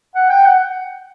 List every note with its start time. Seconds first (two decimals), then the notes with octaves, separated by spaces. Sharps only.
0.15 F#5
0.30 G5
0.46 F#5